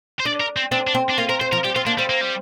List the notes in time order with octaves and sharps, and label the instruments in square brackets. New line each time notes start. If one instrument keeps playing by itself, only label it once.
[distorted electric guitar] C5
[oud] D4 [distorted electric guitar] D5
[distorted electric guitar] A#4
C4
[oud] C4 [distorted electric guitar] D4
[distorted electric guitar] D4
[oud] C4
[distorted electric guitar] D4
[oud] A#3 [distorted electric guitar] F4
[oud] C4 [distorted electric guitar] A#4
[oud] C4 [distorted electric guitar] C5
[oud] F3 [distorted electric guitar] A#4
[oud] G3 [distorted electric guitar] G4
[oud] C4 [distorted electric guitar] F4
[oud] A#3 [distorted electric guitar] D4
[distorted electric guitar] G3 [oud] C4
[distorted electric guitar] A#3
G3